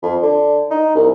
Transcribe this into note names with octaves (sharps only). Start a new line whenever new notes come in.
F2
D3
D#4
C2